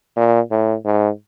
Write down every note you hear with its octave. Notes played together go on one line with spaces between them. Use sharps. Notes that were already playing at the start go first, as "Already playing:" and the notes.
A#2
A2
G#2